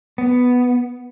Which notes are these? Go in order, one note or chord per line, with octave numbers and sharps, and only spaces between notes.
B3